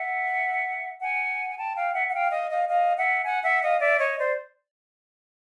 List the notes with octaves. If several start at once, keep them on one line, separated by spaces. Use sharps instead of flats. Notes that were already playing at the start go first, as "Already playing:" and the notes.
Already playing: E5 F#5
F#5 G#5
G#5
G5 A5
F5 G5
E5 F#5
F#5
F5 G5
D#5 F5
D#5 F5
D#5 F5
E5 F#5
F#5 G#5
E5 F#5
D#5 F5
D5 E5
C#5 D#5
C5 D5